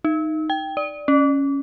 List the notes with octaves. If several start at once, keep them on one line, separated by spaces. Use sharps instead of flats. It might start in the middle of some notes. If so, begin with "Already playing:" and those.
D#4
G5
D5
C#4